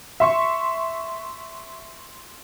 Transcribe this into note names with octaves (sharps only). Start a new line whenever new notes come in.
E5 C6 C#6